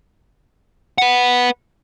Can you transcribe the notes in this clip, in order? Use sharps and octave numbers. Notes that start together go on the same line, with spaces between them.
B4 F#5